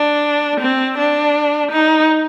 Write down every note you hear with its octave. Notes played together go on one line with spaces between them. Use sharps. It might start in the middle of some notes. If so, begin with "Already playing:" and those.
Already playing: D4
C4
D4
D#4